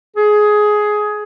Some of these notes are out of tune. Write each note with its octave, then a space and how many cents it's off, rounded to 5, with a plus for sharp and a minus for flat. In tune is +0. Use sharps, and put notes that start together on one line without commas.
G#4 +15